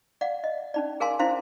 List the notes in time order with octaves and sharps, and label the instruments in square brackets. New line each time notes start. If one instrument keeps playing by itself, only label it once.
[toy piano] D5 F5 F#5
D#5
C#4 D#4 D5
G#4 A#4 F5 G#5 C6
C#4 D#4 E4 C5 F5 C6